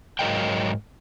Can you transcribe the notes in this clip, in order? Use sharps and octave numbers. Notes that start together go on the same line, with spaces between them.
G#2 F#3 A#4 D#5 F5 G5